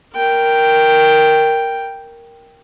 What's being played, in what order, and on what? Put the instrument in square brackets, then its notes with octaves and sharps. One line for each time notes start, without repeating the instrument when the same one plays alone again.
[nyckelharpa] A#4 G5